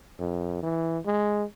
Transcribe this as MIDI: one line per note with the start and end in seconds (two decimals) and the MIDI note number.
0.20 0.58 41
0.63 0.98 52
1.06 1.44 56